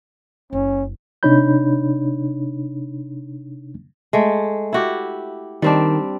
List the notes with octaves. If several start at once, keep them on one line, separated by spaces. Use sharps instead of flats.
F#1 C#4
C3 D4 D#4 C#5 B5 G6
G#3 A3
E4 F#4 G4
D#3 G3 C4 D4